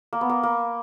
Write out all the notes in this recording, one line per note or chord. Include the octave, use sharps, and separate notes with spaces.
A#3
B3
A#3
A#3